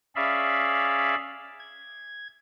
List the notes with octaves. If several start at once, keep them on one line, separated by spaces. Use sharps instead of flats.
C#4 G#4 D5 E5 F5 B5
G#6